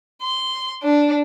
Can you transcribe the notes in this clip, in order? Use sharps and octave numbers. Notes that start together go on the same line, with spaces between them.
C6
D4